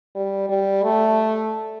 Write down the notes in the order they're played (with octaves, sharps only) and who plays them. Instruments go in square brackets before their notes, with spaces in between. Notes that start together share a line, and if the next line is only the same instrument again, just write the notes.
[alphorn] G3
G3
A3